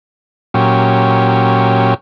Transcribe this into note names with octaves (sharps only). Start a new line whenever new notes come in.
A#2 F#3 C#4 G4